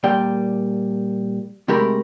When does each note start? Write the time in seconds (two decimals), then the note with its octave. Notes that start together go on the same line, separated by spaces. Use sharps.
0.03 A#2 G3 D5 G5
1.68 C3 G#3 A3 G4 A#4 B5